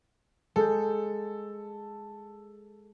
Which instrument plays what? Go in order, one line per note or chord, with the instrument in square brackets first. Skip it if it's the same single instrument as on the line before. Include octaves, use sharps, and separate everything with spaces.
[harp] G#3 G6 [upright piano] A4